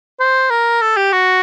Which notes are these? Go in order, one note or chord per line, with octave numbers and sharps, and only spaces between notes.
C5
A#4
A4
G4
F#4